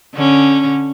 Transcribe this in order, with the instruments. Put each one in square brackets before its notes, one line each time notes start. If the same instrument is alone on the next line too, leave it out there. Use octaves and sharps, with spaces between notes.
[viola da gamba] D3 C#4